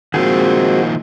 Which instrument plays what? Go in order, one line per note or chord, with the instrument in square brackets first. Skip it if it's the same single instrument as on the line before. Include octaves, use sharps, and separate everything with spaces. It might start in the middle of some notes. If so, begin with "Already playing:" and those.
[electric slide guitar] D#3 F3 A#3 [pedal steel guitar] G#3 C4 G#4 [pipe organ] F#4